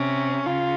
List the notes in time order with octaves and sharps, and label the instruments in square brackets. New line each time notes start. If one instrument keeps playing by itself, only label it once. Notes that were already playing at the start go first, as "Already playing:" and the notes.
Already playing: [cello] C3 [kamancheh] C#4
[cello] C#3 [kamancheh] F4